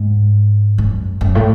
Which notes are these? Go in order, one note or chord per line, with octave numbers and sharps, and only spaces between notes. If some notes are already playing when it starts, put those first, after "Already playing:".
Already playing: G#2
F#2
F#2
A2